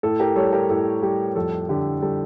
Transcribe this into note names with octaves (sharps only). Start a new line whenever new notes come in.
A2 A4
G4 A#4
G3 A4 C#5
G4 A#4
A2 A4
G3 G4
F2 A4
D3 G4
G3 A4